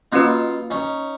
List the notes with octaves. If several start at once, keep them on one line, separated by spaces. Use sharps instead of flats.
A#3 C#4 D#4 F4 F#4 B4
C#4 D#4